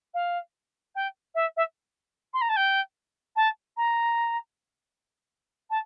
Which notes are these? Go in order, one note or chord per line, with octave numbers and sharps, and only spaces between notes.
F5
G5
E5
E5
C6
A#5
A5
G5
A5
A#5
A5